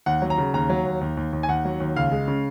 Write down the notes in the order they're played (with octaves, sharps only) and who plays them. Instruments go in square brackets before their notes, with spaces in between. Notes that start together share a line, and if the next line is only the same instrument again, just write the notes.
[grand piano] D#2 F#5
F#3
A#5
C#3
D#2 A#5
F#3
D#2
D#2
D#2
D#2
G#5
D#2 F#5
F#3
D#2
C#2 F5
G#3
C#3